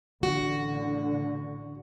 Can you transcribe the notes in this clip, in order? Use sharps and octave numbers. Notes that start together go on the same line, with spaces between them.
A1 D3 F#4